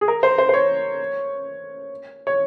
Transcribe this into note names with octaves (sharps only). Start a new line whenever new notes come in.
G#4
A#4
C5
C5
C5
C#5
C#5